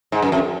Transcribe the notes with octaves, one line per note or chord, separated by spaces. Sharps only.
G#2
F#2
F2